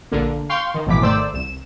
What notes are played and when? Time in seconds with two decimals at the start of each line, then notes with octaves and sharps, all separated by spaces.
0.12 A#1 D3 A#3
0.49 F5 G5 C6 C#6
0.74 D#3
0.86 A1 F2 B2 E3 D6 B6
1.01 G#1 D#3 A3 C5 D5 E6
1.33 C2 E7